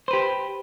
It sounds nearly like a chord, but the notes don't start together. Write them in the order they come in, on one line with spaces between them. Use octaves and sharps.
C5 B4 G4